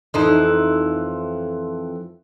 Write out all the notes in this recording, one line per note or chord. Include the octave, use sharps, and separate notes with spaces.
F2 E3 D#4